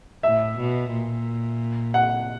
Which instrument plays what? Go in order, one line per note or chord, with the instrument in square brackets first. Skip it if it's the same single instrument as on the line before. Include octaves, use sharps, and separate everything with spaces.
[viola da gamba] A2 [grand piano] E5
[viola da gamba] B2
A#2
[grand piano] F#5